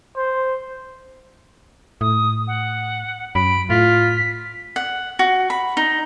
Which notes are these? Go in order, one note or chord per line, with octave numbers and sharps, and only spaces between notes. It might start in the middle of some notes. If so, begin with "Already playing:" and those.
C5
A2 D#6
F#5
F#2 B5 D7
A2 F4 B6
F#5
F#4
B5
D#4